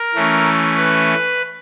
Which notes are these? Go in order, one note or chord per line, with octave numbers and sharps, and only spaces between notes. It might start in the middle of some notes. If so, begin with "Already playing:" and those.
Already playing: A#4
E3 A3 C#4
B4